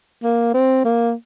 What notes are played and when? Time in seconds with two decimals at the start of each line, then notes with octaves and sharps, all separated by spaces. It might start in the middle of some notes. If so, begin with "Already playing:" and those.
0.23 A#3
0.54 C4
0.85 A#3